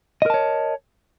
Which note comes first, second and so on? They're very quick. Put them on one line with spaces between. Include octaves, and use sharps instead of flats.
D#5 A#4 A5 C#5